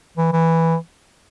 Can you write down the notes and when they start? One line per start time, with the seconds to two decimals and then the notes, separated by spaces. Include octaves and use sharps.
0.18 E3
0.33 E3